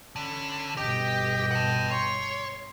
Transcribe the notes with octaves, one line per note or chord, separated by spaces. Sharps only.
D3 C#4 B5
G1 B2 G4 D#5 G5
F#5 A5
C#5 C6